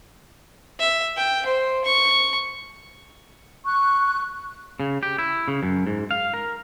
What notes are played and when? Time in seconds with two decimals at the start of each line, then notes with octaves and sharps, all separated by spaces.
0.79 E5
1.16 G5
1.46 C5
1.85 C#6
3.65 C#6 F#6
4.80 C#3
5.03 G4
5.18 E4
5.48 C#3
5.63 F#2
5.87 G#2
6.11 F5
6.34 A#4